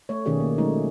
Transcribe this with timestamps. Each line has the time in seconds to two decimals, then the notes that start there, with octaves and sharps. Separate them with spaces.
0.09 A3 C#5
0.25 B2 D#3 C#4 G4 G#4 D5
0.40 A#3
0.58 F#3 G#3 A3 C#4 D#4